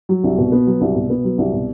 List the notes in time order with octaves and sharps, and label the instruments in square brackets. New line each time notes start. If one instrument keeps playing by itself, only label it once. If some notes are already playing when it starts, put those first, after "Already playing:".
[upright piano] F#3
C2
B2
B3
F#3
C2
B2
B3
F#3
C2
B2